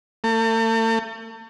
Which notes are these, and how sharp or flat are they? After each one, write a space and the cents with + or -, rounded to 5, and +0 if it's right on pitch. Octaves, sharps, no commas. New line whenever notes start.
A3 +40